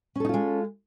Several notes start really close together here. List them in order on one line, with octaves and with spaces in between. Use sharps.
C#4 A4 D#4 F4 G#3